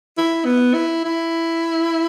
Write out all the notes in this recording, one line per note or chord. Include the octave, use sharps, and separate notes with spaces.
E4
B3
E4
E4